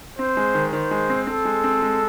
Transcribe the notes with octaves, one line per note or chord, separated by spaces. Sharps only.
C4 C5
G#3
D#3
D#3 C5
G#3
C4
C4 A4
G#3
C4
G#3